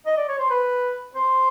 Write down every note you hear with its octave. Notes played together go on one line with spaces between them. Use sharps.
D#5
D5
C#5
C5
B4
C5